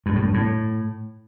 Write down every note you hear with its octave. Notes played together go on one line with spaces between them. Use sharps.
G2
A2
G2
A2